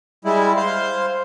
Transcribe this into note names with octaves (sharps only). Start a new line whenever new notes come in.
G3 G#3 E4
C5 F5 C6